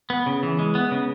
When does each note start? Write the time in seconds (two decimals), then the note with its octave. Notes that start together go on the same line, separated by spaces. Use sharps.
0.10 B3
0.26 C#3
0.43 E3
0.59 G#3
0.75 B3
0.91 C#3